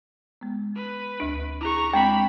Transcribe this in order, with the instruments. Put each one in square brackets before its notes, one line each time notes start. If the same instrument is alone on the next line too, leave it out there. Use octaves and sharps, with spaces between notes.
[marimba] G#3 B3
[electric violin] B4
[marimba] D2 D4
[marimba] E4 G#4 [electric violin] A#5 C#6
[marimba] G#3 C4 [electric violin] D4 B5 [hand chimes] G5